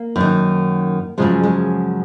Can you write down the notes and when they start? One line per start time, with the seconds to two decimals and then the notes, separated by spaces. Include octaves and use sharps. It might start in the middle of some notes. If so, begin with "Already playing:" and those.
Already playing: A#3
0.16 F#2 D#3
1.18 F#2 C#3 F3 G#3
1.43 G#3